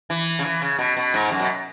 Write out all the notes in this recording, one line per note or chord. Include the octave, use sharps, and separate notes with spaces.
E3
C#3
E3
C#3
B2
B2
G#2
F#2
B2